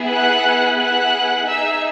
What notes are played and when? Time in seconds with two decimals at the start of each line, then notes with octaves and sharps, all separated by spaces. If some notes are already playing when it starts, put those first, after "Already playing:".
Already playing: B3 E4 G#4
0.10 F#5 F#6
0.78 F#5 F#6
1.46 D#4 G#4 E5 E6